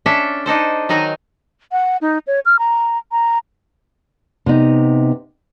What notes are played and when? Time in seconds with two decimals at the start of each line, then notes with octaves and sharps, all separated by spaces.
0.06 C#4 D4 A4 E5
0.46 D4 D#4 A4 C5
0.89 D#3 F#3 D#4 G#5 A#5
1.72 F#5
2.01 D#4
2.27 C#5
2.46 F6
2.59 A#5
3.12 A#5
4.46 C3 B3 D#4